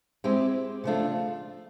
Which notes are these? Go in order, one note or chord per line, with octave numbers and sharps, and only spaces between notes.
G#3 C4 E4 G4
C#3 F3 A3 D4 F4